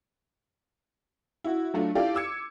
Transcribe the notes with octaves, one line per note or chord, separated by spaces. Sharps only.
E4 F#4
F#3 A3 D4 F4
E4 F4 G4 A4 D5 F5
D6 E6 G#6 C#7